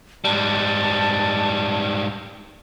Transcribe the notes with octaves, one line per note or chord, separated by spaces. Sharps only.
G#2 G3 A5